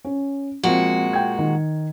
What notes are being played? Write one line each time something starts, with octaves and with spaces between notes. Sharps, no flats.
C#4
A#2 F3 G#3 C4 F#4
G5 G#6
D#3